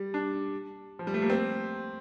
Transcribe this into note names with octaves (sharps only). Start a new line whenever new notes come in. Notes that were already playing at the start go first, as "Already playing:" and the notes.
Already playing: G3
D4
F3
G3
A3
A#3
C4